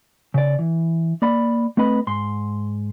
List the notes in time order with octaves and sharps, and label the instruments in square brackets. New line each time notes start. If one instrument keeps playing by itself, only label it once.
[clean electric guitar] C#3 D5
E3
A#3 D5 B5
A3 C4 B4 D#5 B5
G#2 C6